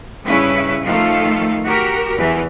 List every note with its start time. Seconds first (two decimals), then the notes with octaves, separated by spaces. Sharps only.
0.24 G2 C#3 C#4 E4 B4
0.84 D#3 F3 A3 A4 F5
1.64 F#4 G4 A#4
2.17 E2 E3